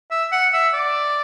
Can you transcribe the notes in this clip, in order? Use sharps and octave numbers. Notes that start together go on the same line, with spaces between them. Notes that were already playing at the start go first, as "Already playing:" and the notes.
E5
F#5
E5
D5